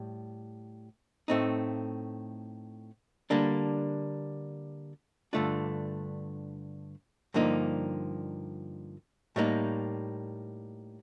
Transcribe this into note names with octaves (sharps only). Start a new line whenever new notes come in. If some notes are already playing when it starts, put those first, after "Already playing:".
Already playing: A2 G3
A2 A3 C4 D#4
D3 G3 A#3 D4
G2 D3 A3 D4 F4
G2 D3 F3 A#3 D#4
A2 G3 A#3 D#4